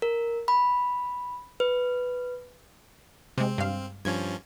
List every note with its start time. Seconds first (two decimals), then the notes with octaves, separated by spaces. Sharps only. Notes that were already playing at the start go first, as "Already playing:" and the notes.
0.02 A#4
0.48 B5
1.60 B4
3.38 C3 G#3 C4
3.58 G2 F5
4.05 G2 F3 C#4 G#6